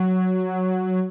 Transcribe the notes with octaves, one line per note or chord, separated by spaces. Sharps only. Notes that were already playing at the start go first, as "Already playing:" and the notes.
Already playing: F#3